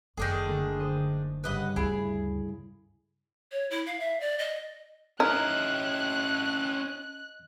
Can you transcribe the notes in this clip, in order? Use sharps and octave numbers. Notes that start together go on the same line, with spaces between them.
F#1 D#3 D4 G#4 A4
D3 A3
C5 D#5
G2 C#3 B4 D#5 F#5
D2 E4 G#4
C#5
E4
F5
E5
D5
D#5
C#4 D#4 E4 D#5 F6 F#6